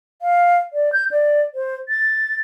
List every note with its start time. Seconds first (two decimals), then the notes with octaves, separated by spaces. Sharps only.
0.22 F5
0.73 D5
0.93 G6
1.11 D5
1.55 C5
1.89 A6